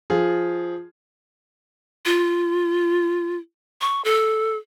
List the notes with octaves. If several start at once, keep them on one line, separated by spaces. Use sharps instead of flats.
F3 F4 G#4
F4
C#6
A4